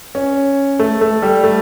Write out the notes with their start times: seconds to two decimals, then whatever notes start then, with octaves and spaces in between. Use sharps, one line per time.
0.15 C#4
0.79 A3
1.01 A3
1.22 G3
1.44 A3